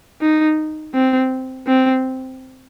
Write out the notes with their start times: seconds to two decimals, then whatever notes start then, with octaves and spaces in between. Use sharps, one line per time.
0.22 D#4
0.95 C4
1.67 C4